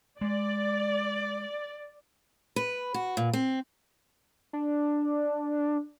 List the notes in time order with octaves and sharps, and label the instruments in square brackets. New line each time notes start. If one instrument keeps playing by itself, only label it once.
[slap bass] G#3 [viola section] D5
[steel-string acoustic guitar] B4
F#4
A#2
C4
[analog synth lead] D4